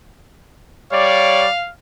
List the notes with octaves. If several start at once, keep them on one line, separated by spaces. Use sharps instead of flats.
G3 C#5 D5 F5